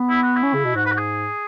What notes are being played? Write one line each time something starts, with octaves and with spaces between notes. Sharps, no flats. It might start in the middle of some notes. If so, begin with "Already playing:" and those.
Already playing: B3
E4
F#4
E4
C#4
C#3
B2
G#2 F#4
B4
F#4
G#4